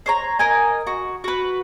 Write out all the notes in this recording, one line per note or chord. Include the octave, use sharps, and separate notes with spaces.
C5 C#5 A#5
A#4 D#5 G#5
F#4
F#4 B4